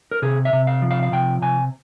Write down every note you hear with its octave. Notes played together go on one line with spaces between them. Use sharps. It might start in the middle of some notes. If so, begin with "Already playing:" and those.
A#4
C3 G#4
E5
C3
F5
F3
F5
F5
C3 G5
C3 G#5